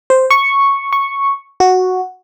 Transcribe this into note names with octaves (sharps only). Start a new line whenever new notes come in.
C5
C#6
C#6
F#4